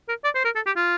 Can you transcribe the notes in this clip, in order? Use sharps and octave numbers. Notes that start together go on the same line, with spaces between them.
A#4
D5
C5
A#4
A4
G4
F4